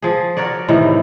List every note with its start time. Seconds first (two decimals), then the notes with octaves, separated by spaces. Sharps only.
0.02 F3 G#4
0.37 F#4 A#4 C#5 D5
0.68 A2 C3 D#3 E3